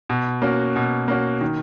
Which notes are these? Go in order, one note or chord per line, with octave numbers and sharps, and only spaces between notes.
B2
A#3 C#4 F#4
B2
A#3 C#4 F#4
D#3